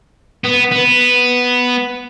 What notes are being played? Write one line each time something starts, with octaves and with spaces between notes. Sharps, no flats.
B3
B3